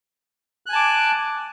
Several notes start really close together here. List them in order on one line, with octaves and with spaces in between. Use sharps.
F#6 G#5 A5 D6